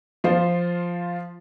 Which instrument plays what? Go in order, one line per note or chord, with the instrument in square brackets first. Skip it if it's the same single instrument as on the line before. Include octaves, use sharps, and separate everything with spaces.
[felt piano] F3 F4 C5